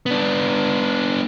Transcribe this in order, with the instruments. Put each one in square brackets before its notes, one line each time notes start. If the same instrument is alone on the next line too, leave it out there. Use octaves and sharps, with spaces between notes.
[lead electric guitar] B3 D4